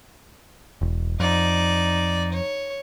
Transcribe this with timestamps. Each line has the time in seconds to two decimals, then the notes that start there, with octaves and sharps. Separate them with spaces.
0.81 E1
1.20 F2 D#4 D5
2.33 C#5